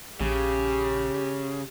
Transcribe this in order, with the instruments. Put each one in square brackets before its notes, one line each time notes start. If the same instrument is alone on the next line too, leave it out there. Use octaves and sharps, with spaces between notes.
[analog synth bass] A#1 [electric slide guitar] C#3 [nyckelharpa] G4